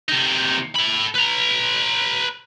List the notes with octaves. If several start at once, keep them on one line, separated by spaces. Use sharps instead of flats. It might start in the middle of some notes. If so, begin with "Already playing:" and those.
C3 D#4
A4 B5
B4 A#5